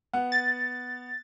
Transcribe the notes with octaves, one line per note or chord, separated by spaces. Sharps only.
B3 F#5
A6